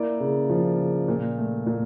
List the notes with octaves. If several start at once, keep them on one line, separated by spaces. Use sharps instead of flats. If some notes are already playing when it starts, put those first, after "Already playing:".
Already playing: A#3 E4 D5
C#3
F3
C#3
A#2
A3
A#2